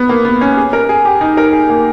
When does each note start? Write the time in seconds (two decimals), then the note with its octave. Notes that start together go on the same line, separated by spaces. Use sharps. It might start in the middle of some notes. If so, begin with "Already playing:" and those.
Already playing: B3
0.09 A#3
0.25 B3
0.41 C#4
0.57 G#4
0.73 A#4
0.89 G#4
1.05 G4
1.21 D#4
1.37 A#4
1.53 G#4
1.69 A#3